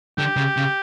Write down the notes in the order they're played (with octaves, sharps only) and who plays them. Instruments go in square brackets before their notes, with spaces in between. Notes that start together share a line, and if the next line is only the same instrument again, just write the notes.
[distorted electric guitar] D3 [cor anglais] G4
[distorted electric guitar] C#3
C#3